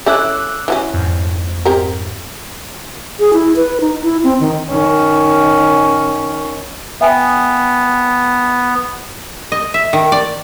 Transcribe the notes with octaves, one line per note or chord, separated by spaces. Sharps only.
A3 C#4 E4 D6 E6 F#6
E3 F#3 C#4
F2 G#2
C4 G4 A#4
G#4
E4
B4
D#4
E4
C4
D#3
D#3 C#4
B3 E5 G5 G#5
D#5
E5
D#3
D5